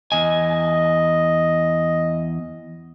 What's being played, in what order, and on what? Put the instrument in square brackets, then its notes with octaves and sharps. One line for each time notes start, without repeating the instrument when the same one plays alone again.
[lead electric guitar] E2 G#5 [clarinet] D#5